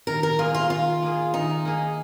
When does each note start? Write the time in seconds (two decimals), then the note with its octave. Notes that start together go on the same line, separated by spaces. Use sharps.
0.07 D#3 A#4
0.23 A#4
0.38 A#3 F4 G#4
0.55 F4
0.70 D#3 F4
1.03 A#3 G#4
1.34 D#3 D#4
1.65 A#3 G#4